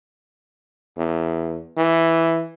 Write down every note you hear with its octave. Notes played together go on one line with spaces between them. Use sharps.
E2
E3